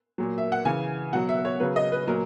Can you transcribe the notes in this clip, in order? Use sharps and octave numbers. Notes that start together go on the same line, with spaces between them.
A#2 F#3
E5
F#5
C#3 E3 G#5
B2 F#3 F#5
E5
C#5
C#3 F#3 B4
D#5
B4
A#2 F#3 A#4